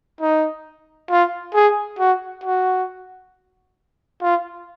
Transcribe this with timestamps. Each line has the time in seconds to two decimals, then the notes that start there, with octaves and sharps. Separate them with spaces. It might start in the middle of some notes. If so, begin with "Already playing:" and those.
0.21 D#4
1.10 F4
1.54 G#4
1.99 F#4
2.44 F#4
4.22 F4